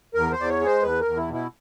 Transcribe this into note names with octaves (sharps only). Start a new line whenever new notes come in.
E2 A#4
C5
E2 D5
C#5
G#3
C5
E2 B4
A#4
E2
E4
B2
E4